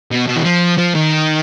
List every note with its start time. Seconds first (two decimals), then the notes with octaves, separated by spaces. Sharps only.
0.11 B2
0.28 B2
0.37 E3
0.44 F3
0.78 F3
0.95 D#3